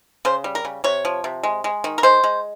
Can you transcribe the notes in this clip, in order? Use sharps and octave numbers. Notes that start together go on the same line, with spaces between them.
C#3 C5
G3
A#4
C#3
C3 C#5
F3
C3
G#3
G#3
D#3
A#4
G#3 C5
G#3